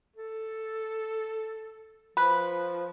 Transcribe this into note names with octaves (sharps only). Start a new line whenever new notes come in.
A4
F3 B4